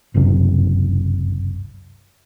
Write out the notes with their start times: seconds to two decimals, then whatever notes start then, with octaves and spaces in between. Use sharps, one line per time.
0.14 G1 C#2 F#2 C3